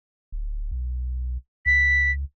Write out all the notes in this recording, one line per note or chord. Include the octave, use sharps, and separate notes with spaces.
D1
B1
C#2 B6